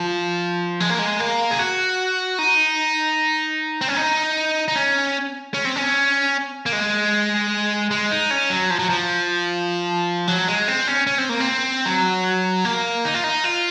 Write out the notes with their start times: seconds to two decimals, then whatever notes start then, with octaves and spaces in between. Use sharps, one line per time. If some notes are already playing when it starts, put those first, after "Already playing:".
Already playing: F3
0.80 G#3
0.90 A#3
0.99 G#3
1.20 A#3
1.51 G#4
1.59 F#4
2.39 D#4
3.81 C4
3.88 C#4
3.96 D#4
4.68 D#4
4.75 C#4
5.54 C#4
5.65 C4
5.76 C#4
6.66 A#3
6.73 G#3
7.91 G#3
8.11 D#4
8.31 C#4
8.50 F#3
8.70 F3
8.79 F#3
8.89 F3
10.28 F#3
10.47 G#3
10.68 C4
10.87 C#4
11.07 C#4
11.18 C4
11.29 A#3
11.40 C4
11.86 F#3
12.65 A#3
13.05 D#4
13.14 F4
13.24 D#4
13.44 F4